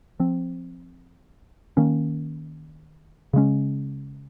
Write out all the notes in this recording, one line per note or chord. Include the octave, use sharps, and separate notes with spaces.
F3 C4
D#3 A#3 C#4
C#3 G#3 C#4